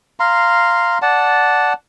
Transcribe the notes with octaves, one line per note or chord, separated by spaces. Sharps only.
F5 A#5 C6
D5 F#5 A5